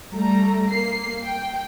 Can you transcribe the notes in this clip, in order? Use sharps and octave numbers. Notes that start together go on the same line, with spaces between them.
G3 A3 A#5
A#3 C7
G5